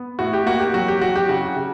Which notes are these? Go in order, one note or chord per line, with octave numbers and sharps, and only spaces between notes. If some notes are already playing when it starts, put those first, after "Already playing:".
Already playing: B3
A2 F#4
G4
A#3 F#4
G4
F#3 F#4
G4
F#3 F#4
G4
C#3 F#4
C#3